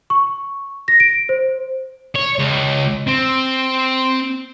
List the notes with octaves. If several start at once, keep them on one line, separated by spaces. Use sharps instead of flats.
C#6
A#6
D7
C5
C#5
C#2
C4